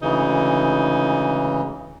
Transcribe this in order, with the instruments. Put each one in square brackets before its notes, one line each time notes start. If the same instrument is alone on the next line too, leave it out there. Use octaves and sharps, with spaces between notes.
[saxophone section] D2 G#2 D#4 [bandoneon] C#3 E3